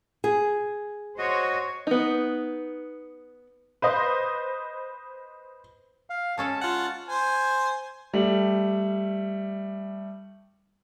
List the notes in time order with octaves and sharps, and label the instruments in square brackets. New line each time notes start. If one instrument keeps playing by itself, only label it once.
[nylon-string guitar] G#4
[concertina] F#4 D#5 [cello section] C5 C#5
[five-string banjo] B3 D#4
[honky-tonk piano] B4 C5 D#5
[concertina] F5
[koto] G#3 C#4 A4 [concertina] A5
[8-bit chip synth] F4 F#5
[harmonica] C5 G#5
[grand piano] G3 A3